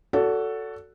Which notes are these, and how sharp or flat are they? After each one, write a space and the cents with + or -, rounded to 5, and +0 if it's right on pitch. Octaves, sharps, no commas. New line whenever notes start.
F#4 +0 A4 +5 D5 -40